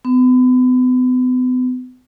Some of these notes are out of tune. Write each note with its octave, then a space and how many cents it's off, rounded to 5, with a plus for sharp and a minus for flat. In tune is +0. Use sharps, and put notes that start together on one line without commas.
B3 +40